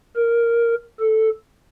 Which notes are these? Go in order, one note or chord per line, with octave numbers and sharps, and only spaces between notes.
A#4
A4